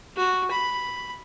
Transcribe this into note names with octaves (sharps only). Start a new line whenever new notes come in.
F#4
B5